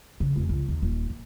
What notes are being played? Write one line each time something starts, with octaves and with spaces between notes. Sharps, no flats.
C#3
F1
C#2
D#2
D#1
A#2